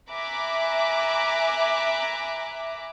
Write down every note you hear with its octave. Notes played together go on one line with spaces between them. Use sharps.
E5 G#5 A#5 B5 D6 F#6